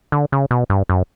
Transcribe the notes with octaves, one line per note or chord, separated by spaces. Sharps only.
D3
C#3
B2
G2
F#2